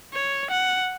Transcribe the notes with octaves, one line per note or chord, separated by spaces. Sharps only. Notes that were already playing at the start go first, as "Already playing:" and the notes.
C#5
F#5